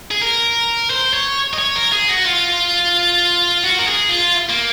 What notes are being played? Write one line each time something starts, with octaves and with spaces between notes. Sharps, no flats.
G#4
A#4
C5
C#5
D#5
C#5
A#4
G#4
F#4
F4
F#4
A#4
G#4
F4
A#3